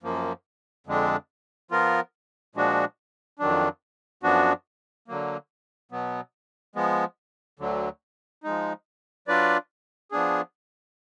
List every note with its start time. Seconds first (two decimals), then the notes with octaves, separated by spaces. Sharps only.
0.03 F#2 F3 A#3
0.87 F2 D3 G#3 D4
1.71 F3 B3 F4 A#4
2.55 A#2 F3 G#3 D4 F#4
3.39 F2 D#3 F#3 D4
4.23 F#2 F3 B3 D4 F#4
5.08 D3 F#3 A#3
5.92 B2 F#3 B3
6.75 F3 G#3 B3
7.59 D2 D3 F#3
8.43 F3 G#3 D#4
9.28 F#3 D4 F4 B4 D5
10.11 F3 B3 D4 G#4